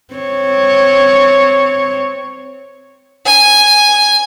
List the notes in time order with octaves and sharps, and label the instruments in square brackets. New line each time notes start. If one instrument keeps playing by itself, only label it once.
[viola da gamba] C4 C#5
[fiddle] G#5